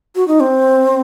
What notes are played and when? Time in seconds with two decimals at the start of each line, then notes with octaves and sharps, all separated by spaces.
0.16 F#4
0.28 D#4
0.40 C4